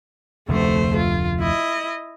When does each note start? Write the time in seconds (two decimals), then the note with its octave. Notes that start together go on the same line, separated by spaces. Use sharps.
0.49 F1 D2 A3 C5
0.97 F4
1.39 E4 D#5